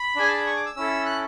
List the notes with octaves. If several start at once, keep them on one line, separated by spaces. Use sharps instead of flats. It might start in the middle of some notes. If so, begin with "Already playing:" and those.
Already playing: B5
D4 G#4 G#5
A5
B5
C#6
D6
E6
C#4 E4 A4 E6
F#6